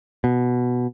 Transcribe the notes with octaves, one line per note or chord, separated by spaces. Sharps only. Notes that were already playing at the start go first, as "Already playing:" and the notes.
B2